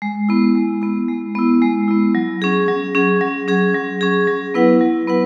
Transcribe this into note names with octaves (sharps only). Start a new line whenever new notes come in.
G#3
B3 E4
G#3
B3 E4
G#3
B3 E4
G#3
B3 E4
F#3
C#4 G#4
F#3
C#4 G#4
F#3
C#4 G#4
F#3
C#4 G#4
F#3
B3 E4 B4 F#5
F#3
B3 E4 B4 F#5